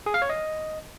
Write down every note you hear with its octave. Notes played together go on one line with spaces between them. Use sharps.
G#4
F5
C#5
D#5